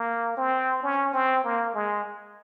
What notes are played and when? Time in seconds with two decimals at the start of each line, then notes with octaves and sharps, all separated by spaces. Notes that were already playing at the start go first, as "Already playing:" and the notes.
Already playing: A#3
0.37 C4
0.83 C#4
1.13 C4
1.44 A#3
1.74 G#3